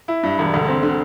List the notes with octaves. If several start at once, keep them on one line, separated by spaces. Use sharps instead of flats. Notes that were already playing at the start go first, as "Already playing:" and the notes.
E4
G2
E1
D2
C4
D3